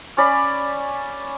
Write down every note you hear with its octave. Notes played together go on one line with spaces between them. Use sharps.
C#4 C#5 D5 B5